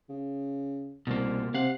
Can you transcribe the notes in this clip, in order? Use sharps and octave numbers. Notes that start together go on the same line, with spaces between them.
C#3
C2 B2 A#3
C3 F5 F#5